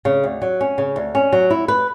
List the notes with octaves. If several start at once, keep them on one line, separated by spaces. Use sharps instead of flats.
C#3
D2
F#3
C#4
C#3
D2
C#4
F#3
E4
B4